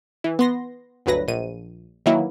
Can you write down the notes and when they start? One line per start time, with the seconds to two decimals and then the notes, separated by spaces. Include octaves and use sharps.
0.24 E3
0.39 B3 C6 A#6
1.06 G1 D2 F#3 B4 A#6
1.28 A#1 D#7
2.06 D#3 E3 F#3 A#3 E4